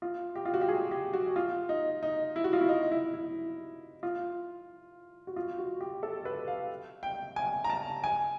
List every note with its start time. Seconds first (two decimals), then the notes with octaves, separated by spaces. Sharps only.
0.02 F4
0.35 G4
0.45 F4
0.54 F#4
0.61 G4
0.69 G#4
0.91 G4
1.13 F#4
1.36 F4
1.69 D#4
2.03 D#4
2.36 E4
2.44 F#4
2.53 F4
2.61 E4
2.69 D#4
2.91 E4
3.14 E4
4.03 F4
5.27 F#4
5.36 F4
5.59 F#4
5.81 G4
6.03 A4
6.25 B4
6.48 F5
7.03 G5
7.36 G#5
7.64 A#5
7.70 A5
8.04 G#5